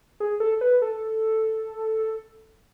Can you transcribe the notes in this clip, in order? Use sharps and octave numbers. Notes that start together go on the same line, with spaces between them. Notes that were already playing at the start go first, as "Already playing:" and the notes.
G#4
A4
B4
A4